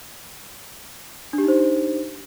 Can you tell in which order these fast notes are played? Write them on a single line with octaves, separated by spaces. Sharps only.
D4 G4 D#4 C5